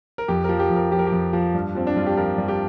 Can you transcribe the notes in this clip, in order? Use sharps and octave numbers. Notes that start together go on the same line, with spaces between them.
A#4
F2 G4
F3 A#4
G4
F2
A#4
F3 G4
A#4
G4
F2
F3
G2
F3 C4
D4
G2 F4
G4
F3 A#4
G2
G4